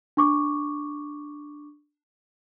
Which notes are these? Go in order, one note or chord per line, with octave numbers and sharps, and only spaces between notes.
D4 C#6 D6